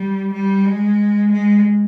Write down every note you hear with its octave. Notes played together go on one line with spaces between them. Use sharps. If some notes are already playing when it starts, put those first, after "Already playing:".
Already playing: G3
G3
G#3
G#3